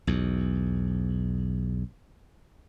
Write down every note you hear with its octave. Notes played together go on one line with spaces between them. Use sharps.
B1 E2